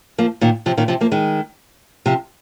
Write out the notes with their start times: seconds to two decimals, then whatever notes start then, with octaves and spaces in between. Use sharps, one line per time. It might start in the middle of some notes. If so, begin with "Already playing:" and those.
0.18 F3 A#3
0.41 A#2 D#3
0.66 C3 F3
0.77 A#2 D#3
0.88 C3 F3
1.01 F3 A#3
1.11 D#3 G#3
2.06 C3 F3